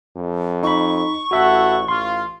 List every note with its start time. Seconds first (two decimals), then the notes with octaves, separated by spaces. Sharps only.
0.16 F2
0.63 D#4 B5 C#6
1.31 A1 E4 F#4 A4 E5 F#5
1.88 A1 F4 C6